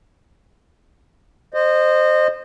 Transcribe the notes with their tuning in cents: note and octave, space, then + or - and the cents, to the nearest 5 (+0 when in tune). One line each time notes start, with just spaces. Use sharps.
C5 +0 D#5 -25